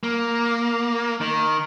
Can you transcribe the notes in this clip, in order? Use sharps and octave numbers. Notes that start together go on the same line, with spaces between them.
A#3
D#3